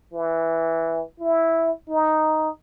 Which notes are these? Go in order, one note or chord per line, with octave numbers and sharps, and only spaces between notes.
E3
E4
D#4